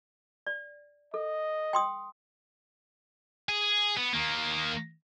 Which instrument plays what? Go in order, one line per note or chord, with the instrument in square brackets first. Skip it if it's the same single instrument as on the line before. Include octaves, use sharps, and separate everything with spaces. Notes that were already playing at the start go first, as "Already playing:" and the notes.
[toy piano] D5
[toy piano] A4 [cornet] D#5
[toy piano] G5 C6 D#6
[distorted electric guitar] G#4
B3
D#3 A#3